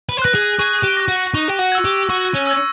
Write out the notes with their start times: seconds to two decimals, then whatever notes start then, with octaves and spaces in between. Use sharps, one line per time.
0.09 B4
0.17 C5
0.22 B4 F#6 A#6
0.35 G#4
0.59 G#4 C#6
0.84 G4
0.97 F#6 A#6
1.09 F#4
1.34 D#4 C#6
1.48 G4
1.59 F#4
1.72 E6 G#6
1.85 G4
2.09 F#4 C#6
2.34 C#4
2.47 E6 G#6